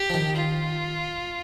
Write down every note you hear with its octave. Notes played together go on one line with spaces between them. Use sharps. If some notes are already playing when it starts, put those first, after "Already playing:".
Already playing: G4
F3
D#3
F4